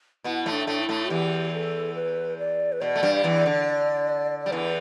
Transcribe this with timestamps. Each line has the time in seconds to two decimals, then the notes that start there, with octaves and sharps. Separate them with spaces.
0.24 B2 B3 E4
0.46 A2 A3
0.53 D4
0.67 A2 A3
0.81 E4
0.89 A2 A3
1.10 E2 E3 G4
1.53 A4
1.95 B4
2.39 D5
2.72 B4
2.81 B2 D5
2.95 A3
3.03 G2 G3
3.24 E2 E3
3.46 D3
4.40 D5
4.46 G3
4.52 E2 E3 B4